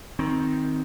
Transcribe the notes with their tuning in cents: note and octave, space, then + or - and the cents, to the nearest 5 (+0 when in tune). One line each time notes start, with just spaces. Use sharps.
D#3 +10 C4 +0